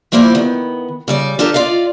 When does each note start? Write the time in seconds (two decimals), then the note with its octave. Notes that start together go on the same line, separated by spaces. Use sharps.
0.12 F3 G3 A#3 E4 C5 D5
0.35 D#3 B3
1.08 C#3 G3 D5
1.39 D4 F4 G4 A4 A#4
1.54 F4 D5 D#5 F5